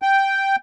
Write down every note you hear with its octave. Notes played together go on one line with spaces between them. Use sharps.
G5